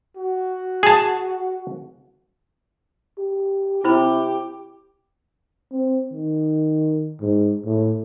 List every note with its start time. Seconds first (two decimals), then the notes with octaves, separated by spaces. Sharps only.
0.16 F#4
0.83 G#4 A5
3.18 G4
3.84 C3 E4 G4 C5 B5
5.72 C4
6.12 D#3
7.21 G#2
7.65 A2